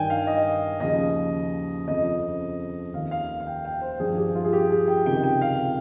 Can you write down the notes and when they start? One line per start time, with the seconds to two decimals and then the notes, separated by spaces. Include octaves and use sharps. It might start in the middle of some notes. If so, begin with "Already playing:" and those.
Already playing: G2 D#3 G5 G#5
0.10 F5
0.27 D#5
0.80 D#2 C#3 F3 D#5
1.87 F2 C#3 F3 D#5
2.93 D#2 D#3 F5
3.11 F5
3.40 F5
3.47 G5
3.65 G5
3.81 C5
3.99 G2 F3 G#4
4.17 G4
4.35 F4
4.44 G#4
4.53 G4
4.71 G#4
4.88 G5
5.06 C#2 C3 D#3 G5
5.24 G5
5.42 F5